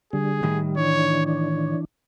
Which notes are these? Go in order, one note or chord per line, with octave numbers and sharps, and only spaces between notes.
D3 G3 G#4
A2 D#3 G3
E3 D4 C#5
C#5